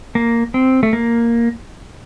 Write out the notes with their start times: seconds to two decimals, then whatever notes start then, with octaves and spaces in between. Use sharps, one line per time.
0.15 A#3
0.54 C4
0.83 A3
0.93 A#3